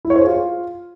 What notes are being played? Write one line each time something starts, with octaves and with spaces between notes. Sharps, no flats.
E4
C#5
C5
G#4
F4